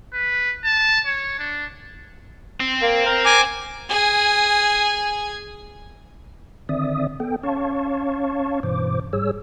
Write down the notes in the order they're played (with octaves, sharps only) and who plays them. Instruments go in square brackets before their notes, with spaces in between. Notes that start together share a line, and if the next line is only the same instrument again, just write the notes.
[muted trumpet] B4
A5
C#5
D4
[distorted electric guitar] C4
[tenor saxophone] A#3
A#4
[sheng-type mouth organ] G#5 D6
[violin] G#4 G#5
[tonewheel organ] D3 D#3 C4 D5 E5 D#6
B3 A4 G5
C#4 C#5 F5 A5 C#6
G2 B2 E3 C5 D6
G#2 G3 G#4 C#5 E6